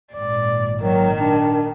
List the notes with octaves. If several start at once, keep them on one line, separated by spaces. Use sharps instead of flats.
G#1 A#2 D5
D#3 F#3 A#4
D4